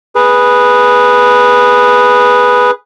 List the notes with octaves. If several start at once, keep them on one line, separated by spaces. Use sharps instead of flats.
G#4 B4